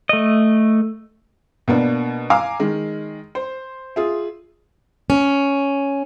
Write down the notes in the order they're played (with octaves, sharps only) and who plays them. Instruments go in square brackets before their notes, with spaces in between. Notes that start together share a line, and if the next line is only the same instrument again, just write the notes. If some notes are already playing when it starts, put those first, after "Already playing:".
[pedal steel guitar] A3 D#5
[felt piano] B2 A#3 B3 D4
F5 G#5 A#5 D6 E6 F6
D#3 G#3
C5
F4 G#4 E5
[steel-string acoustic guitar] C#4